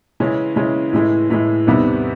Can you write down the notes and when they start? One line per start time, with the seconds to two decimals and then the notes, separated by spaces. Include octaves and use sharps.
0.20 C#3 E3 G#3 C#4
0.56 C#3 E3 G#3 C#4
0.93 A2 E3 G#3
1.30 A2 E3 G#3
1.67 E2 C3 D#3 G3 B3